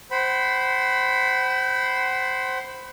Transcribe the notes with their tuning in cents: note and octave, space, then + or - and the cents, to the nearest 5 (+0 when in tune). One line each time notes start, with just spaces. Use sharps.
C5 +0 F#5 +40 B5 +10